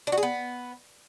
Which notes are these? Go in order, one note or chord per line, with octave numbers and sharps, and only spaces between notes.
D4
F#4
G#4
B3